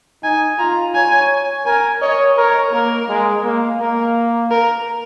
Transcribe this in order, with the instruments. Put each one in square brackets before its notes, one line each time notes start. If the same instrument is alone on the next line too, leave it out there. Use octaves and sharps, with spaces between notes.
[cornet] D#4 [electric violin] G#5
[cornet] F4 [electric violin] A#5
[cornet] C#5 [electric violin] G#5
[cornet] A#4 [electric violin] G#5
[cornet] C#5 [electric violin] D#5
[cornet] A#4 [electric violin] C#5
[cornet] A#3 [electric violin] A#4
[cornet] G#3
A#3
[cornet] A#3 [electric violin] A#4
[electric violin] A#4